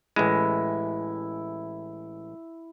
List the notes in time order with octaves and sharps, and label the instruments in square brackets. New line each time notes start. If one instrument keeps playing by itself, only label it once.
[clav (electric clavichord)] A1 G#3 [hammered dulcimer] E4